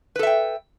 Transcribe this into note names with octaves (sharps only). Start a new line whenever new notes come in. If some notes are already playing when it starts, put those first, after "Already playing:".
A4 B4 E5 G5